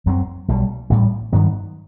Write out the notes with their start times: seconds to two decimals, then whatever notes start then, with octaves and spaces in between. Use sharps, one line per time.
0.06 F#2 F#3 A3 C4
0.48 B1 B2 G3
0.90 A1 A2 G3
1.33 G2 D#3 F#3 B3